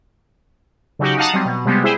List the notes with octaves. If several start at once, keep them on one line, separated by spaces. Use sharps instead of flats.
C#3 F#3 D#4 F#4 G4
D#4 F5 F#5 A5 A#5 D#6
F#3 G3 C4
B2
C3 G3 G#3 B3
E4 G#4 C5 E5